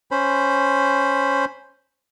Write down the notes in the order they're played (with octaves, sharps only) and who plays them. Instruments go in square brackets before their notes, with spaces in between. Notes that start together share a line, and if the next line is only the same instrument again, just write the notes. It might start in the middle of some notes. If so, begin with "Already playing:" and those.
[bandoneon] C#4 C5 B5